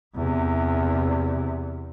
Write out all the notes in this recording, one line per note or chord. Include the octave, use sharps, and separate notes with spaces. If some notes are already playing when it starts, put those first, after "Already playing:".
E2 C3